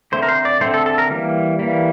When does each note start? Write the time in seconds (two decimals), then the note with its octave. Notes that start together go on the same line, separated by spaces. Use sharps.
0.12 D3 A3 C4 C5
0.23 A#4
0.28 C5
0.45 D5
0.60 D3 A3 C4 C5
0.74 A4
0.86 A4
0.98 A#4
1.10 E3 G3 A#3
1.59 E3 G3 A#3